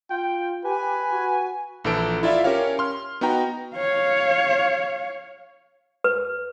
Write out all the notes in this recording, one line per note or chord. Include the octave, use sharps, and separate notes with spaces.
F4 G5
G4 B4 G#5
F#4
A#1 E3 A4 D7
E4 F4 D5 E5 F5
C#4 G4 A#4 C#5 F5
C6 F6
B3 D#4 F#4 G5 A#5
C#5 F5
B4